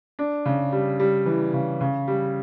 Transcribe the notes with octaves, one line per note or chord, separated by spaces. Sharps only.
D4
C#3
G3
G3
E3
C#3
C#3
G3